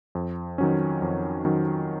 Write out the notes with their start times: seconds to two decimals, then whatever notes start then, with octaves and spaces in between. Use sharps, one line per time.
0.15 F2
0.58 D#3 F#3 C#4
1.02 F2
1.45 D#3 F#3 C#4